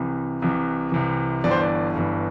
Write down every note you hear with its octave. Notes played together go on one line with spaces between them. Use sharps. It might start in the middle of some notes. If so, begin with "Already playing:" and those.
Already playing: C2 C3 E3
C2 C3 E3
C2 C3 E3
G1 G2 E3 D5
C5
D5
G1 G2 E3